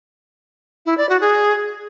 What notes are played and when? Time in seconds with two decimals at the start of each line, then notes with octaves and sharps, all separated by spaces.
0.86 E4
0.98 D5
1.09 F#4
1.21 G#4